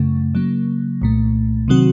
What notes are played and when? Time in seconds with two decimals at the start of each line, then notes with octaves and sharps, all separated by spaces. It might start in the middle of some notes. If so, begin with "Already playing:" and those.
Already playing: F#2 C#3 A3
0.35 C#3 F#3 A#3
1.02 C2 A#2 A3
1.68 C3 D#3 F#3 C4 F#4